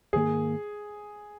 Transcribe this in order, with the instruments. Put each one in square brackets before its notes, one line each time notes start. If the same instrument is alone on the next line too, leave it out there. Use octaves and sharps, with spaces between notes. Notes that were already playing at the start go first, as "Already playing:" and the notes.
[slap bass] G#2 D#3 A#3 [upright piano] G#4